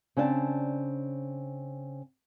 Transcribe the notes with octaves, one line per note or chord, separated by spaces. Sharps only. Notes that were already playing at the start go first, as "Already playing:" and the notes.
C#3 C4 D4 F#5 A5